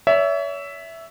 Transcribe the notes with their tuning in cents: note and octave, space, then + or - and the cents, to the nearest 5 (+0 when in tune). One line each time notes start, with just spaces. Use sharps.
C#5 +35 E5 +0